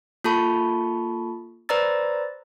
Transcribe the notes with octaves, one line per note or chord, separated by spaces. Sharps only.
A#3 F4 A4 A5 B5 C#6
B4 C5 D5 A#5 E6 A6